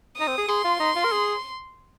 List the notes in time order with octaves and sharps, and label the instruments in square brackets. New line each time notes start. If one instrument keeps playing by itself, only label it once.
[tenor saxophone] D#4 [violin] D#6
[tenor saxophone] C4
G#4
[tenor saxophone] G#4 [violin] C6
[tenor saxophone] F4
D#4
F4
A#4
G#4